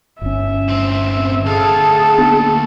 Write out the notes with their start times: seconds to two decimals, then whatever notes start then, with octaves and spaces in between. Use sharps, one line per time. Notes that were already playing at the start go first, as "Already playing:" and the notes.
0.21 G1 C#4 E5
0.68 D2 C4
1.46 D2 G#4 A4 F5
2.18 A#3 B3 D4